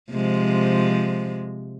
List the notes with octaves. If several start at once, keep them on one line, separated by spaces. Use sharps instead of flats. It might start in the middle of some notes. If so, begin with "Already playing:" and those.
C3 F3 G#3